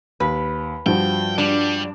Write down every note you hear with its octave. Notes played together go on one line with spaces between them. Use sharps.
D#2 B4
G2 F3 F#4 G5
G3 D4